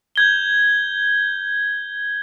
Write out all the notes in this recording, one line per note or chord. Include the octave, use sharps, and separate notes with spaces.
G6 G#6 G7